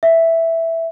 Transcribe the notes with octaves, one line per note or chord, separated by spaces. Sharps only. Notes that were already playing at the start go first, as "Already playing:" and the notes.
E5